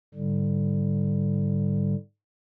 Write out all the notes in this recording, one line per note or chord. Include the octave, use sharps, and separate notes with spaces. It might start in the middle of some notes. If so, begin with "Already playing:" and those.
G#2 D3 G3